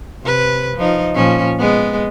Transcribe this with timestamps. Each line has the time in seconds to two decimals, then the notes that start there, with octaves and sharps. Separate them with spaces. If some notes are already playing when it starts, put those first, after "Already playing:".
0.23 C3 B4
0.77 F3 D#4
1.15 A#2 F3 C#4
1.59 G#3 B3